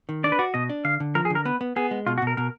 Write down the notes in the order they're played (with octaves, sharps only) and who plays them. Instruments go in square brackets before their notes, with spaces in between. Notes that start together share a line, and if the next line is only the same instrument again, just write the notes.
[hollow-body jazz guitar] D#3
[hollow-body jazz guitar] D4 [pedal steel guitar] D5
[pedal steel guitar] B4
[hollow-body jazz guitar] F#4 [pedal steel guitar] D5
[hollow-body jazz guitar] B2 [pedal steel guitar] D#5
[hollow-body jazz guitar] D4
[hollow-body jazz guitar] D3 [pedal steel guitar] F5
[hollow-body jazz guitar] D3
[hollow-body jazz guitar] F3 [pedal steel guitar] A#4
[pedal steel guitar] G#4
[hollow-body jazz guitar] D3
[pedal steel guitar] A#4
[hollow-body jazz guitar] B3 [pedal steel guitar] B4
[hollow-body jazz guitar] B3
[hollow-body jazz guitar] B3 [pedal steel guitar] G#4
[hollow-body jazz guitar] G#3
[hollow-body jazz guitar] B2 [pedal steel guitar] F4
[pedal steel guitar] F#4
[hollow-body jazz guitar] B2 [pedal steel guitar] A#4
[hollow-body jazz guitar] B2 [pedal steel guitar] A#4